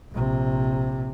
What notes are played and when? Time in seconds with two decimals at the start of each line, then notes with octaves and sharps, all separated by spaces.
0.12 A#1 C3